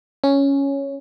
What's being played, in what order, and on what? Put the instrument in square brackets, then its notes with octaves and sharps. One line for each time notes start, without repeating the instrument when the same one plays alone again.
[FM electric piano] C#4